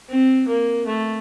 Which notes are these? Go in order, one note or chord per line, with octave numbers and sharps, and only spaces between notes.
C4
A#3
A3